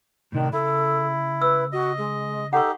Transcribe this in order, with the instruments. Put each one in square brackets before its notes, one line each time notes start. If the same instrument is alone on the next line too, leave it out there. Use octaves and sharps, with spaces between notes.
[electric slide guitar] A2 C3 D4 [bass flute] D#3
[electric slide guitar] C#3 [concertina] E4 [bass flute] A4
[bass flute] B4 [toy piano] E6
[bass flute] F#4 [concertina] D#5
[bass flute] G#3
[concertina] D#4 G4 [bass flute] A4 [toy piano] F#5 C#6